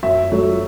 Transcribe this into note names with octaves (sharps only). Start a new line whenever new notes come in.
F#2 E5
F#3 A3